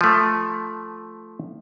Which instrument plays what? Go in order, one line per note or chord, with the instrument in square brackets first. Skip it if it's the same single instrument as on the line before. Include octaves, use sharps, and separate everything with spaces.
[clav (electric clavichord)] F3 A3